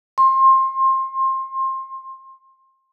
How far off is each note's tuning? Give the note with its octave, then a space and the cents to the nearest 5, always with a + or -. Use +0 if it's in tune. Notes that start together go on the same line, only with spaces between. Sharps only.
C6 +25